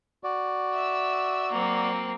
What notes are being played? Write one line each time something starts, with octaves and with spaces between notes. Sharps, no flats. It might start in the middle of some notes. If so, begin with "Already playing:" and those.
F#4 D5
E5 E6
F#3 A#3 C4